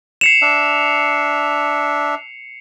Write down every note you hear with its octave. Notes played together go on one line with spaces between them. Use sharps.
C7 C#7 E7 F7
D4 E5